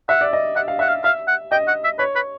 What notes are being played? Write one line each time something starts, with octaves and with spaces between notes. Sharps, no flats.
E5 F#5
D5
D#5
E5 F#5
F5
E5 F#5
F5
E5 F5
F#5
D#5 G5
F#5
E5
B4 C#5
B4